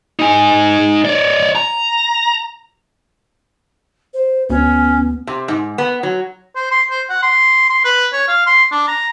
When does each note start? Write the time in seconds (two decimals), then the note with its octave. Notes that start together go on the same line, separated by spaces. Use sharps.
0.19 D#4 G#5
1.05 C#5 D5
1.56 A#5
4.14 C5
4.50 D2 B3 C#4
5.27 C3
5.48 G#2
5.78 B3
6.03 F#3
6.56 C5
6.71 C6
6.90 C5
7.10 F#5
7.23 C6
7.70 C6
7.85 B4
8.13 C#5
8.28 F5
8.47 C6
8.72 D4
8.88 A#5